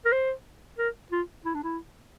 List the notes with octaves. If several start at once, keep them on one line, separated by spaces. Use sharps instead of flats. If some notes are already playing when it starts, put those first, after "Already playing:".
A#4
C5
A#4
F4
E4
D4
E4